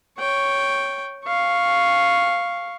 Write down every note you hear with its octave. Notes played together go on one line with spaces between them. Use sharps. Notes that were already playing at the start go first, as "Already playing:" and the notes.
C#5 G5
F5 C#6